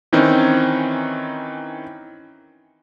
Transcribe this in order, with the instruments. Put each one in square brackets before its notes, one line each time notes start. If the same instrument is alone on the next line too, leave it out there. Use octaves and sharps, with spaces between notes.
[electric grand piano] D#3 E3 C4 C#4 D#4